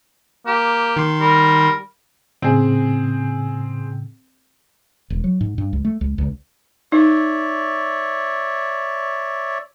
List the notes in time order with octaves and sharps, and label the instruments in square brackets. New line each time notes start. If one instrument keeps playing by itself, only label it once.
[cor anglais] A#3 [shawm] G4
[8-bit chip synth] D#3 C6
[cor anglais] G3 [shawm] A#4
[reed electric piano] A2 C#3 [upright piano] C4 G#4
[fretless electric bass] E1
F#3
G#2
G2
C#2
A3
C#2
C#2
[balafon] D#4 [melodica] C#5 D5 E5